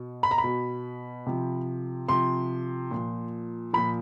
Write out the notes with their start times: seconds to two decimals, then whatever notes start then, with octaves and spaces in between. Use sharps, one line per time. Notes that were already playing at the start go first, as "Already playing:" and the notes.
Already playing: B2
0.23 B5
0.31 A#5
0.38 B5
0.44 B2
1.27 C3 F3
2.09 C3 F3 C6
2.91 A#2 F3
3.73 A#2 F3 B5